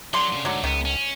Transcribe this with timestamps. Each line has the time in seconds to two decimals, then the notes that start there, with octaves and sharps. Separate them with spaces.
0.14 D3 F#3 C6
0.33 A#2 C#3
0.45 D2 G#2 D3 F#3
0.64 C#2 D#3 B3
0.85 C#4